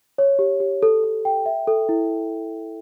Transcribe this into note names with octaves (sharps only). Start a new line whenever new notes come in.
C#5
G4
G4
A4
A4
G5
E5
A4
E4